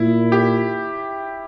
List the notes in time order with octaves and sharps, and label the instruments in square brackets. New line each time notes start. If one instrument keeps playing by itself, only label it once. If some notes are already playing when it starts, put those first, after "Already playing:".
Already playing: [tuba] A#2 [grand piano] E4
[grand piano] G4